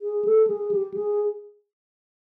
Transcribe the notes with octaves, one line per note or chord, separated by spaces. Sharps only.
G#4
A4
G#4
G4
G#4